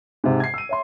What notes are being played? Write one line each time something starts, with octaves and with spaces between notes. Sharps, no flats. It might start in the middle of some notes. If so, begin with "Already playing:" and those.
G#2 C3
G#6 C7
E6 D#7
C#5 E5 C6